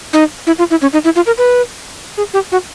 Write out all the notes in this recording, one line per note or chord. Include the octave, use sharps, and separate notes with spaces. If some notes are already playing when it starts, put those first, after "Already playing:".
D#4
E4
F4
E4
C#4
D#4
E4
F4
A#4
B4
G#4
G4
F#4